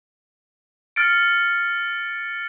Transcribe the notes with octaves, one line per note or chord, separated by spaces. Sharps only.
F6 A6 C#7 D7